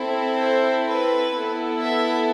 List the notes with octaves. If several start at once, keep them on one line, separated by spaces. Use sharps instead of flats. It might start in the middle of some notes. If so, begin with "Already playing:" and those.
Already playing: C4 E4 A4
C5
B4
B3 E4 A4
E5